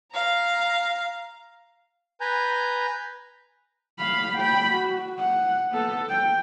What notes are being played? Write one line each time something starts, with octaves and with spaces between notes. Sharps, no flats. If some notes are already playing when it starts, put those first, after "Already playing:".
F5 A#5
B4 G#5 A#5 G6
F5 B5
G5 B5
F#4
F#5
B3 A4
G5